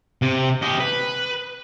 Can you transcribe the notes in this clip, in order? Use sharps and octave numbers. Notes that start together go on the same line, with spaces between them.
C3
G4 D#5
B4